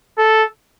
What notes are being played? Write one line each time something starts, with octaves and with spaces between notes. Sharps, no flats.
A4